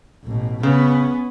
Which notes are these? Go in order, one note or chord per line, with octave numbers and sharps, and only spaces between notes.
A1 B2
C#3 B3 C#4